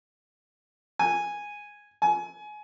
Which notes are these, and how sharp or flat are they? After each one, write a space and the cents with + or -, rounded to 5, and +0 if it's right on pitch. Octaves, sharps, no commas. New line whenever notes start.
G#5 -5
G#5 +25